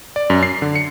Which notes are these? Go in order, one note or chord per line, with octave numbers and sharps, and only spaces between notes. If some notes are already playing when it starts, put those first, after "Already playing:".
D5
F#2
C7
D3
C#7